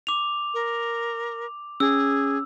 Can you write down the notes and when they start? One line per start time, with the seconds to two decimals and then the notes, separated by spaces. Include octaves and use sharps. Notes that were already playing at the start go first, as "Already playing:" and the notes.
0.07 D6 F7
0.54 A#4
1.80 C#4 G#4 E6